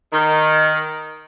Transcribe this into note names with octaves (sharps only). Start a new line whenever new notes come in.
D#3